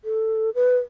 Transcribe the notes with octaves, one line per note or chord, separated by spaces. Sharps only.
A4
B4